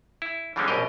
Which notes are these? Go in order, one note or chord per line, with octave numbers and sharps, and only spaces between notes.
E4
D3 E3 G3 G#3 C4 C#4
A#1 F#2 B2 G4 A#4 D#5